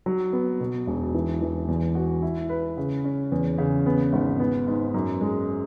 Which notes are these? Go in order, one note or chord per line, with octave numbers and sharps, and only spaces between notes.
F#3
B3
B2
E1
E3
E3
E2
F#4
E4
B4
C#3
C#4
E2
C#3
B3
G#1
B3
G#2
F#2
G#3